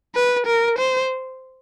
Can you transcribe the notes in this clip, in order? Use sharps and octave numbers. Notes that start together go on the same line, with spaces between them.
B4
A#4
C5